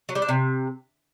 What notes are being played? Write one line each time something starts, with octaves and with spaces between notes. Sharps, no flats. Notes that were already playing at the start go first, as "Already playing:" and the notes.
F#3
G3
D4
C3